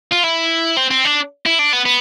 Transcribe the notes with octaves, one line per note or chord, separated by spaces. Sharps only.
F4
E4
C4
C4
D4
E4
D4
B3
B3